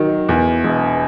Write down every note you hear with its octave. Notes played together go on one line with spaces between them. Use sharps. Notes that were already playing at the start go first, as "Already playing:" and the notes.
Already playing: D#3 F#3
E2
E1